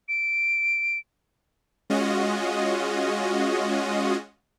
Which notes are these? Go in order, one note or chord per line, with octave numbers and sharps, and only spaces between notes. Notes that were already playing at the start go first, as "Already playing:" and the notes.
D7
G#3 C#4 F4 F#4 D#5